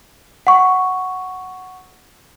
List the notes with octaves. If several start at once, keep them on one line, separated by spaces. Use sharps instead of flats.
F#5 C#6